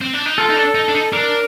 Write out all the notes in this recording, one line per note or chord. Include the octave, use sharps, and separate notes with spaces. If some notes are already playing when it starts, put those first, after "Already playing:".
C4
D4
D#4
F4 A4
D#4
D4
D#4
D4
D#4
D4 A#4